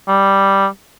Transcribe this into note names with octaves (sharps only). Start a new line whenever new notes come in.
G3